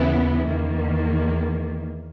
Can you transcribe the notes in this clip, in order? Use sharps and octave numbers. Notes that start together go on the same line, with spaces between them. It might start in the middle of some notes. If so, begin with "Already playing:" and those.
Already playing: D#2 C#3 E3 B3 E4
E2 D#3 A#3